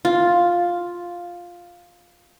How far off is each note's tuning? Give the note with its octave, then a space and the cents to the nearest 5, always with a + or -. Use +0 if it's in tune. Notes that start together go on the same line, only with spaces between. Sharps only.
F4 +5